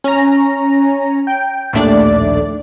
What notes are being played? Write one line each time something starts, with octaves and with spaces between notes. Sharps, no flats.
C#4 A#5
G5
A#1 D#2 A2 A3 D4 D5